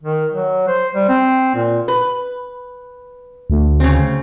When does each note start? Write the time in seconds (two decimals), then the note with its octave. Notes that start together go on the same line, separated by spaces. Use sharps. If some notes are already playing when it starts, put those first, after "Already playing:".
0.03 D#3
0.31 F#3
0.68 C5
0.95 G3
1.09 C4
1.55 A#2
1.88 B4
3.50 D2
3.80 C#3 C4